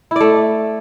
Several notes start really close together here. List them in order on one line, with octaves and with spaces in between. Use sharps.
E4 D5 A3